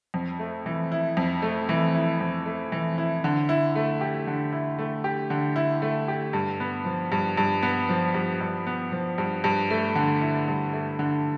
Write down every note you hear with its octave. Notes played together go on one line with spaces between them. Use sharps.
F2
A3
E3
E4
F2
A3
E3
E4
F2
A3
E3
E4
D3
E4
A3
G4
D3
E4
A3
G4
D3
E4
A3
G4
G2
B3
F3
G2
G2
B3
F3
G2
G2
B3
F3
G2
G2
A3
D3
E4
G2
A3
D3